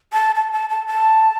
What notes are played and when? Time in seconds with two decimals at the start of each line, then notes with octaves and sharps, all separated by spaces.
0.13 A5
0.35 A5
0.52 A5
0.70 A5
0.87 A5